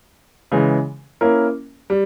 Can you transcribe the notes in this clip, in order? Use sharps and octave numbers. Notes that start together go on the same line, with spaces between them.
C#3 E3 G#3
A#3 C#4 E4 A#4
G3